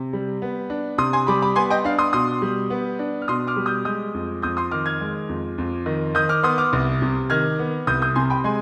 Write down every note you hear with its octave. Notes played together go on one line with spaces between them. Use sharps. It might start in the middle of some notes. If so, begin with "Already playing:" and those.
Already playing: C3
G3
B3
D4
C3 C6 D#6
G#5 C6
G3 B5 D6
B5 D6
B3 G#5 C6
D#5 G5
D4 F5
C6 D#6
B2 C6 D#6
G3
B3
D4
F6
B2 C6 D#6
D6 F6
G3
D#6 G6
G#3 D#6 G6
F2
F2 D#6 G6
C6 D#6
D#3 D6 F6
F6 G#6
G#3
F2
F2
D#3
D#3 D#6 G6
D6 F6
B3 C6 D#6
D6 F6
C2
C3
D#3 F6 G#6
B3
C2 D#6 G6
D#6 G6
C3 G#5 C6
G5 B5
G#3 G#5 C6